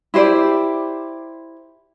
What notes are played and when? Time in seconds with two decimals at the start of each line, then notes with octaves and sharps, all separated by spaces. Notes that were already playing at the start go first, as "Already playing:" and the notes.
0.14 E4 G4 C5 D5